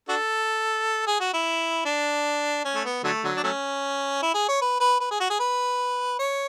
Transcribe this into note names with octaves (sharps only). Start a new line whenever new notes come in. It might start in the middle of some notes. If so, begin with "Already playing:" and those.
D4 F#4 A4
G#4
F#4
E4
D4
C#4
A3
B3
D3 F#3 A3
D3 F#3
D4
F#3 A3 C#4
E4
G#4
C#5
B4
B4
B4
G#4
F#4
G#4
B4
C#5